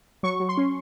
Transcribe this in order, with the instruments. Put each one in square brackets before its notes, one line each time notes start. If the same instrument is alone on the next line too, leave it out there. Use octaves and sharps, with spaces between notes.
[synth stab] F#3 C#6
F#3
C6
C#4